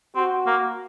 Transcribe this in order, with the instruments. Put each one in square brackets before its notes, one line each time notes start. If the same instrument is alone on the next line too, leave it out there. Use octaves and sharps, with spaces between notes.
[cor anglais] C4 [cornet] F#4
[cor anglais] A#3